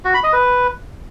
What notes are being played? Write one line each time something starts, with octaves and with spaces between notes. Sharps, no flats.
F#4
B5
D#5
B4